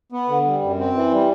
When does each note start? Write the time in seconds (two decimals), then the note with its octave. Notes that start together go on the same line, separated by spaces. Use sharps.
0.12 B3
0.28 D3
0.46 G3
0.62 F#2
0.79 C4
0.94 E3
1.11 G3